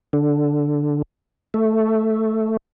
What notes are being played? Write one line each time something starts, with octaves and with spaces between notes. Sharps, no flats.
D3
A3